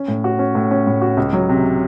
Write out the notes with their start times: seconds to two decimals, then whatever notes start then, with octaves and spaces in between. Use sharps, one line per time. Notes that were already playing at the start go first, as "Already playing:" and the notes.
Already playing: C#4
0.08 A2
0.24 F#4
0.39 C#4
0.55 A2
0.71 C#4
0.87 A2
1.02 F#4
1.17 C#2
1.33 F#3
1.49 C3